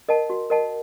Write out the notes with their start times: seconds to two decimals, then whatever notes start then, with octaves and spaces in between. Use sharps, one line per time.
0.09 A#4 D#5 F#5 A5
0.30 F#4
0.50 A#4 D#5 F#5 A5